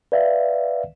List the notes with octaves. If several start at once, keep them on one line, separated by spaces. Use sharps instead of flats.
B4 D5 E5 F5